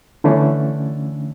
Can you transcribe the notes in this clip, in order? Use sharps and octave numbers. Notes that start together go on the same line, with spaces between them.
D3 E3 A3 C#4 D4